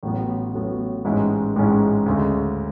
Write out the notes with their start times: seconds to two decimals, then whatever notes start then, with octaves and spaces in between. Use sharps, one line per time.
0.03 A1 A2 F#3 B3
0.53 A1 A2 F#3 B3
1.05 A1 G#2 G#3 C#4 E4
1.56 A1 G#2 G#3 C#4 E4
2.06 D2 C#3 G#3